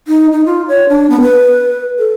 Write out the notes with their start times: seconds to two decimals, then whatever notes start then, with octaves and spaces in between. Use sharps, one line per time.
0.08 D#4
0.32 D#4
0.46 F4
0.68 C#5
0.89 D4
1.10 B3
1.21 B4
1.99 A4